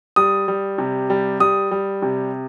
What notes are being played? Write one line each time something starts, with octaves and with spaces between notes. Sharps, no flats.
G3 D#6
G3
C3
G3
G3 D#6
G3
C3